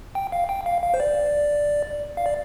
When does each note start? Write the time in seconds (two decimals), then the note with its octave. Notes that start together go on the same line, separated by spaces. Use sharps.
0.15 G5
0.32 F5
0.49 G5
0.66 F5
0.82 F5
0.94 C5
1.00 D5
2.17 F5
2.26 D5